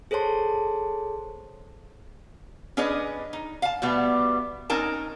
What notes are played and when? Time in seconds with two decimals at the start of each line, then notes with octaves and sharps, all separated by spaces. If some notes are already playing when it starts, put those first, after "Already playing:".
0.11 G#4 A4 C5 C#5 A5 C6
2.77 C#4 D4 G#4 B4 D#5
3.33 D#4
3.62 F5 A5
3.82 B2 G3 A3 B3
4.70 C4 C#4 D#4 A#4 A5